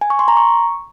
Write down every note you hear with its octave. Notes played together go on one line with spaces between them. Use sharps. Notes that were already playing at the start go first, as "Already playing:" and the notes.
G#5
C#6
C6
A#5
C#6